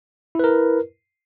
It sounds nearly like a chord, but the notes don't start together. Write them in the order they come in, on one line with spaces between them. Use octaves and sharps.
E4 B4 A#4